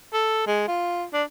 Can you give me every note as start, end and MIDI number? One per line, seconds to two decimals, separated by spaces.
0.13 0.47 69
0.47 0.67 56
0.68 1.04 65
1.14 1.23 62